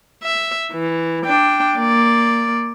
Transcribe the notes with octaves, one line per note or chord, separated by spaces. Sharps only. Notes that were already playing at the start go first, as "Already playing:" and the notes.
E5
E3
D4 G5
A#3 D5